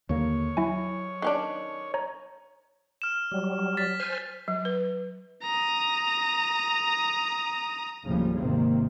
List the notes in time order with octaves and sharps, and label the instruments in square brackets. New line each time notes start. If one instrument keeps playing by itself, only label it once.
[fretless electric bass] D#2 D3 A#3 [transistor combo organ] C#5
[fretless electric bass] F#3 [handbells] E4 E5 G#5
[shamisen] D#3 C#4 D4
[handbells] C#5 A#5
[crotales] F6 E7
[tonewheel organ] F#3 G3
[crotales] A6 B6
[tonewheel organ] C5 G#5 F6
[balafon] F#3
B4
[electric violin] A#5 D#6
[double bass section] F1 D#2 A2 C#3 F3 G3
G#1 C3 D#3 A#3 C4